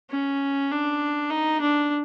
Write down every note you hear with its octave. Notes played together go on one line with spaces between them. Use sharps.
C#4
D4
D#4
D4